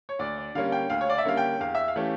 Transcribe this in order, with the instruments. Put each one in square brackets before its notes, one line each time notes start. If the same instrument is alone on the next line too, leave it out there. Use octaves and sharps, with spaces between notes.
[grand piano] C#5
[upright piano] D2 [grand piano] D5
[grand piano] D5
[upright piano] D3 G3 A#3 C#4 [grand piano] F5
[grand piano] G5
[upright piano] D2 [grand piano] F5
[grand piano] C#5
D5
E5
[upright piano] D3 G3 A#3 C#4 [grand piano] F5
[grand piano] G5
[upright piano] E2 [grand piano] F5
[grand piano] E5
F5
[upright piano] E3 A3 C#4 G4